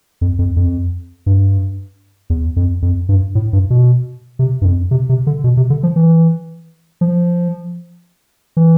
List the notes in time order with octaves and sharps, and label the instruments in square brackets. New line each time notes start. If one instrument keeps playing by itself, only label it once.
[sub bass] F2
F2
F2
G2
E2
F2
F2
G2
A2
G2
B2
C3
G2
F2
C3
C3
D3
B2
C3
D3
F3
E3
F3
E3